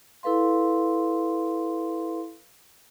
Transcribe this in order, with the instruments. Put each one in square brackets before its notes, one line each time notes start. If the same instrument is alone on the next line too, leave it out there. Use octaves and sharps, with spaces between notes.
[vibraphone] E4 A4 B4 F5 C6